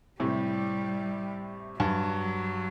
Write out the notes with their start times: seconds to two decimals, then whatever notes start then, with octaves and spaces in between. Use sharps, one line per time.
0.20 A2 C3 G3
1.80 G2 F#3